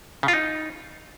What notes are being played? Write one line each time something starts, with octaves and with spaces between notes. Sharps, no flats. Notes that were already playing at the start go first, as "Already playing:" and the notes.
C#3
F4
D#4